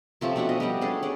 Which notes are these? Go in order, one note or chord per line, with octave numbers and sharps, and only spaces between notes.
C3 F3 A3 C#4
B2 D4 E5 F#5
D#5
G3 A3 G4 F#5
C#4 D4 G#4 A4
C#4 D5